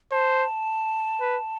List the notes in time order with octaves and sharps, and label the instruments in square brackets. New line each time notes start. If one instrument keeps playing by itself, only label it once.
[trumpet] C5 [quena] A5
[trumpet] B4